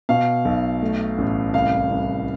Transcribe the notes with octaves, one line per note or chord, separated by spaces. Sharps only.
B2 F5
B1
A3
A1
C2 F5
C2